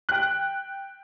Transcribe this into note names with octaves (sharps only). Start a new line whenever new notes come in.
G5 F#6